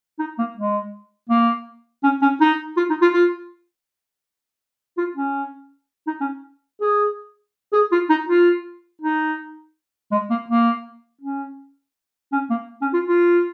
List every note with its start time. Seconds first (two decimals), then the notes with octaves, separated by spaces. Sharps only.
0.19 D#4
0.38 A#3
0.57 G#3
1.29 A#3
2.03 C#4
2.22 C#4
2.40 D#4
2.77 F4
2.90 D#4
3.01 F4
3.13 F4
4.98 F4
5.16 C#4
6.07 D#4
6.20 C#4
6.81 G#4
7.73 G#4
7.92 F4
8.09 D#4
8.28 F4
9.01 D#4
10.11 G#3
10.30 A#3
10.48 A#3
11.21 C#4
12.32 C#4
12.50 A#3
12.81 C#4
12.93 F4
13.06 F4